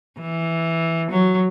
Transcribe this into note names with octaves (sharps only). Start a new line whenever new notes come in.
E3
F#3